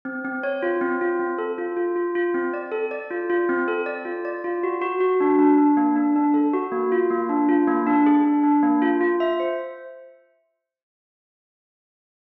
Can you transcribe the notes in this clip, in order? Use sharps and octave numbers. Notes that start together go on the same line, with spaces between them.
C4
C4
C#5
F4
C4
F4
C4
A4
F4
F4
F4
F4
C4
D5
A4
D5
F4
F4
C4
A4
D5
F4
D5
F4
F#4
F#4
F#4
D4
D4
D4
A#3
D4
D4
A4
F#4
A#3
F4
A#3
D4
F4
A#3
D4
G#4
D4
D4
A#3
F4
F4
E5
C5